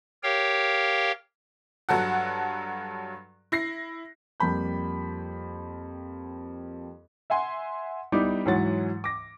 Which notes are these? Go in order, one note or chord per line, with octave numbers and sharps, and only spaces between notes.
G4 A#4 C#5 F5 G5
G2 F#3 A4 F#5
E4 A#6 C7
F2 G3 A#3 B5 G6
E5 F#5 G#5 C6
G3 B3 D#4 E4 D6
G#2 E3 F#3 C#5 F#5 A6
D6 A#6